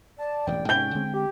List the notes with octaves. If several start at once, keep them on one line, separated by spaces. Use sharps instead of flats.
D5 A5
E1 A1 G#2 G5
G#2 C3 G#3 C#4 G6 G7
D3 G#3 C4
G4 G5